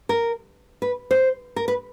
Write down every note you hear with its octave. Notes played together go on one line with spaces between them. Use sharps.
A#4
B4
C5
A#4
B4